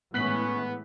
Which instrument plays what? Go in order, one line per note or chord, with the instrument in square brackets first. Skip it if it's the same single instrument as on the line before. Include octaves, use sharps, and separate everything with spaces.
[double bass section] A2 E3 G#3 [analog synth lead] B3 [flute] C#4 [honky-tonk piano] F#6 B6 F#7